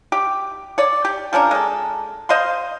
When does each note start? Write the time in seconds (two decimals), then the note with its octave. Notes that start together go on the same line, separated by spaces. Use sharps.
0.12 G4
0.78 C#5 D5
1.05 G4
1.33 F3 C#4 D4 A#4
1.51 G#3 A4
2.29 C5 D#5 F5 C6